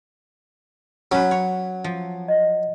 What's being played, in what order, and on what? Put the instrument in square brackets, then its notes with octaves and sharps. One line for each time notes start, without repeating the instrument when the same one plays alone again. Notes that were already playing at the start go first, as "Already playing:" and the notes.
[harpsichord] F#3 [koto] C#4 B4
[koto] C#5
F3
[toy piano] D#5